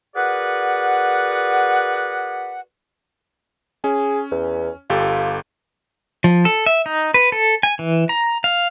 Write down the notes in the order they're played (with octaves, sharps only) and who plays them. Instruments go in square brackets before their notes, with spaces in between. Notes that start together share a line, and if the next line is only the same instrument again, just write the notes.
[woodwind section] F#4 G#4 A#4 B4 D5 F#5
[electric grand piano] C#4 [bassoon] G#4
[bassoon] E2
[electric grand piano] G1 G4 A4 [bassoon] F4
[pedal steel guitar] F3
A4
E5
D#4
B4
A4
G#5
E3
A#5
F5